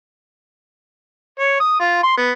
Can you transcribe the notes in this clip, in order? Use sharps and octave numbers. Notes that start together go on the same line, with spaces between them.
C#5
D#6
F4
C6
B3